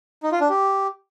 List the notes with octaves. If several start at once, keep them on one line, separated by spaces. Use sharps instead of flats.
D#4
F4
D4
G4